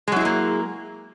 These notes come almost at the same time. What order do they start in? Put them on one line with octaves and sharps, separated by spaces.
G#3 F#3 E4 G#4 A#3